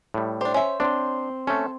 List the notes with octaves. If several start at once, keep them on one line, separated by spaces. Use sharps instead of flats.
A2 G3
D4 G4 C5
C#4 E5
C4 D4 C6
A3 C#4 A4